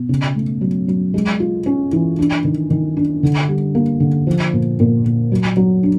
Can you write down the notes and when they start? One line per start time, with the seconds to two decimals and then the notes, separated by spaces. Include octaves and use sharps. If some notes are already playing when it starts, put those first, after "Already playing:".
Already playing: B2
0.09 C#3
0.36 A3
0.61 F#3
0.88 F#3
1.14 G#3
1.40 F4
1.66 C#4
1.93 E3
2.19 D4
2.45 D#3
2.70 D#3
2.97 D4
3.23 D3
3.48 G3
3.75 A#3
4.00 D3
4.27 F3
4.53 A#2
4.80 A#2
5.04 A#2
5.32 F#3
5.57 F#3
5.83 D4